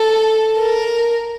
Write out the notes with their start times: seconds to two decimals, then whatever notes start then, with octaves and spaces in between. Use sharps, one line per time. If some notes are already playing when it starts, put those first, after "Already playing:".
Already playing: A4
0.58 A#4